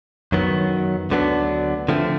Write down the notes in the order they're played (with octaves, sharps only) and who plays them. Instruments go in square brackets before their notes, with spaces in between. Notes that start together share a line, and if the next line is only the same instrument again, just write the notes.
[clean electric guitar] F#2 D#3 F#3 B3
D2 D3 F#3 B3 D4
D3 F3 A3 C4